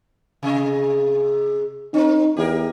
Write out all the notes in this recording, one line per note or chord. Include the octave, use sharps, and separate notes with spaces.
C3 G#4 D#5
C4 D#4 A#4
E2 G4 G#4 A#4